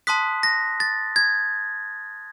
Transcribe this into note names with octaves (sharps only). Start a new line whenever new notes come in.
A5 C6 D#6 F#6 B6
A#6
A6
G#6